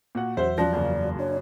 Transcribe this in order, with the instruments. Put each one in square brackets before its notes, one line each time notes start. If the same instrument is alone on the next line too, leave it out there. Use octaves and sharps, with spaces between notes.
[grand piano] A#2 F#4 F#5
[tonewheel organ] E2 F#3 [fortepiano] C5 [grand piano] E5 F#5
[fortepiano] F3 [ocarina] D5 [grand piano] F#6 A#6
[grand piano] F#2 C#3 A#3
[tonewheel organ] D4 [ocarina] C#5